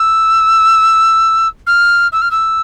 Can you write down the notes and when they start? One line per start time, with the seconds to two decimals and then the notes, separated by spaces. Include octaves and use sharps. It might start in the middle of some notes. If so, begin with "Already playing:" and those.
Already playing: E6
1.66 F6
2.12 E6
2.21 F6
2.31 E6